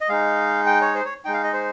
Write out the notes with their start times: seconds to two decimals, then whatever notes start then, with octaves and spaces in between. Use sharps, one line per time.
0.01 D#5
0.09 G#3 D#4 F5
0.66 G5
0.81 C#5
0.95 C5
1.05 C#5
1.25 G#3 D#4 G5
1.33 F5
1.44 D#5
1.53 C5